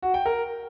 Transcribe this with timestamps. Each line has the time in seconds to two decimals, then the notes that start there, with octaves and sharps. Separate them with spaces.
0.02 F#4
0.14 G5
0.26 A#4